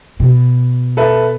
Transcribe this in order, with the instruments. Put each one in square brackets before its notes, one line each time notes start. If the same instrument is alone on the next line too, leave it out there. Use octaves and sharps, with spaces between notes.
[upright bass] B2
[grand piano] A4 B4 E5